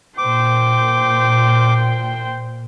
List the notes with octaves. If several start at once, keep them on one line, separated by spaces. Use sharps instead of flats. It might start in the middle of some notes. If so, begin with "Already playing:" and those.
A#2 C5 G5 D6